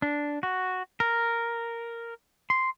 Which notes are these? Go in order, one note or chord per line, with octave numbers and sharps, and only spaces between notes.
D4
F#4
A#4
C6